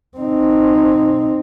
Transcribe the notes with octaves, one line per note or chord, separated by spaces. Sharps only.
C4 D#4